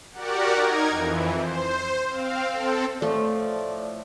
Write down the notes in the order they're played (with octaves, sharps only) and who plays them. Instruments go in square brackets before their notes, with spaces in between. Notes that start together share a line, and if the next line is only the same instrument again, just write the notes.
[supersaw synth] F#4 G4 A#4 D5 F#5
D#4 A#4 G#6
F2 E3
C5
C4 F5
C4 A4
[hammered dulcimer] A2 F3 [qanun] A3 [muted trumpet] D5